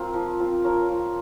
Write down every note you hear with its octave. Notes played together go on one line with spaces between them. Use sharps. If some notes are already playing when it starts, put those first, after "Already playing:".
Already playing: C4 F4 A#4
F3
C4 F4
F3 A#4 C#5
C4 F4